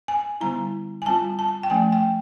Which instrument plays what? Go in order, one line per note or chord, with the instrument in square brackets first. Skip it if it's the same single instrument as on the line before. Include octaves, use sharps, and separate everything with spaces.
[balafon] G#5
D3 G3 B3 E4 A#5
G#5
G3 C4 F4 A5
A5
G5
F3 A3 C#4 G#5
G5